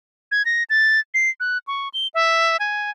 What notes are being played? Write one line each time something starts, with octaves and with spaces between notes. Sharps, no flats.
G#6
A#6
A6
C7
F#6
C#6
G7
E5
G#5